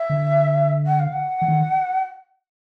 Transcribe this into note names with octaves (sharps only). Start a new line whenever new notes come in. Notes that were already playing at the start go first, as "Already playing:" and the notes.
Already playing: E5
D3
F#5
F5
F#5
E3
D#3